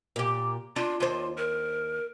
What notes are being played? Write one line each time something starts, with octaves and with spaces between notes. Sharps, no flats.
A#2 G4
D4 F4
D#2 F4 C5
A#4